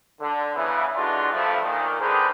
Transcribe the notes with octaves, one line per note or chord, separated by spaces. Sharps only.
D3
C#3 E3 B3
D3 E3 G#3 D4 F4 F#4
G2 F3 A3
A#2 D#3
D3 D#3 G#3 G#4 B4 C5